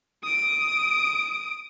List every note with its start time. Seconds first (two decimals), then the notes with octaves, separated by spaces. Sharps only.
0.23 D#6 D7